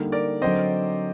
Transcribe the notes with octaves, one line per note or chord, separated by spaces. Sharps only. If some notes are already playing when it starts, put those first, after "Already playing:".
Already playing: D3 G3 A#3 D#4
A#4 D5
D3 F#3 C4 C5 D#5